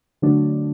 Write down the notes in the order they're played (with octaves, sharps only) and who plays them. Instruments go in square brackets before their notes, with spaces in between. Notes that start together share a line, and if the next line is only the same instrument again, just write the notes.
[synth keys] D3 F#3 A3 D4